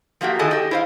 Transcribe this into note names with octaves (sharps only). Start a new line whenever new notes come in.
F3 A3 A#3 F#4 G4
D#3 E4 G#4 A4 D#5 A5
G4 D#5
E4 C5 F5